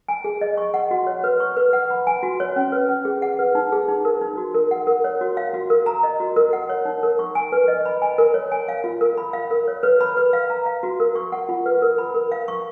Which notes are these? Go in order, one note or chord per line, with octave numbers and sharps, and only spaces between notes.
G#5
G#4
D#5
C#6
F#5
F#4
C#5
B4
C#6
B4
F#5
B5
G#5
F#4
C#5
C#4
B4
C#4
G#4
F#5
B4
D#4
G#4
D#4
A#4
D#4
F#4
A#4
F#5
A#4
C#5
F#4
F5
F#4
A#4
A#5
D#5
F#4
A#4
F#5
C#5
D#4
A#4
C#6
G#5
B4
D#5
B5
G#5
A#4
C#5
G#5
F5
F4
A#4
B5
F5
A#4
C#5
B4
B5
B4
F5
A#5
F5
F#4
A#4
C#6
F#5
F4
B4
A#4
B5
A#4
F5
C#6